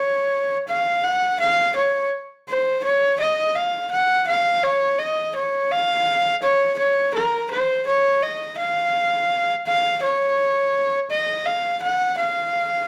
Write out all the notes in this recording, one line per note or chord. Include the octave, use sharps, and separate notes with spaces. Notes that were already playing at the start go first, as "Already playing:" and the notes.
Already playing: C#5
F5
F#5
F5
C#5
C5
C#5
D#5
F5
F#5
F5
C#5
D#5
C#5
F5
C#5
C#5
A#4
C5
C#5
D#5
F5
F5
C#5
D#5
F5
F#5
F5